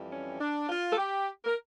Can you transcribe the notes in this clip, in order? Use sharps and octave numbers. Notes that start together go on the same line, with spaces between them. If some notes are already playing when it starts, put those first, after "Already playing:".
Already playing: F2 E3 G3
C#4
D4
F4
A4
G4
A#4